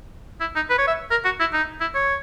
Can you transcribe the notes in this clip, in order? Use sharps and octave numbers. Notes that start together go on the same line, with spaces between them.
E4
D#4
B4
C#5
E5
A#4
F#4
E4
D#4
E4
C#5